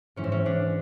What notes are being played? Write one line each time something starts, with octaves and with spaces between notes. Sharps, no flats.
G#2 E3 C#4
C4
C#4
D4